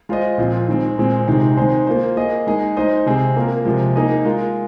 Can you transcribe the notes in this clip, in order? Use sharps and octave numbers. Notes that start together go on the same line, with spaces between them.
G#3 F4 C5 D#5
A#2 F3 C4 F4
D#3 G#3 C4
A#2 G#3 C4
C3 D#3 G#3 C4 D#4
D#3 G#3 D#4 G#4 C5
A#3 F4 C5
A#3 G#4 D#5
G#3 D#4 G#4 D#5
G#3 D#4 C5 D#5
C3 G#3 C4 G#4
A#3 F4 A#4
C3 F3 G#3
A#3 D#4 G#4 D#5
G#3 F4 A#4